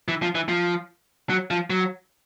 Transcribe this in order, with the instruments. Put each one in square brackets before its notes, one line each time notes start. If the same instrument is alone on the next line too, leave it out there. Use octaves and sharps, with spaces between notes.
[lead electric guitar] E3
F3
E3
F3
F#3
F3
F#3